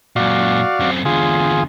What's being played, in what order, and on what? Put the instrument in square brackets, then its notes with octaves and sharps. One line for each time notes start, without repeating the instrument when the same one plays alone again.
[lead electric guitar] F#2 A#2 [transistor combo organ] F#4 D5 F5
[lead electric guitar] F#2 C4
[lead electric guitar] E2 D3 [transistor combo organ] F4 G#4